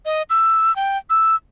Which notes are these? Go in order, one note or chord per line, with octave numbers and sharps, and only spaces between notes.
D#5
E6
G5
E6